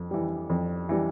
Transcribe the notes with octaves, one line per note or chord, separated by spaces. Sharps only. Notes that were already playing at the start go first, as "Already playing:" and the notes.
Already playing: F2
E3 G3
F2
E3 G3